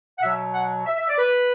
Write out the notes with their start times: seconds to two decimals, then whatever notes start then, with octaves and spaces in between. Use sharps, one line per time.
0.19 F#5
0.23 B2 F#3 E5
0.54 F#5
0.86 E5
0.99 E5
1.09 D5
1.18 B4